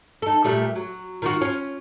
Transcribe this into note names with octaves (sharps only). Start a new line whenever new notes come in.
D#4 A4
A#2 G3 A3
F#3
D#3 F4 F#4
C#4 F4